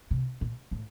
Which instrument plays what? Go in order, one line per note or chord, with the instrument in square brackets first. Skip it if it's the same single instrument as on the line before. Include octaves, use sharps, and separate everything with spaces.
[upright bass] C3
A#2
A2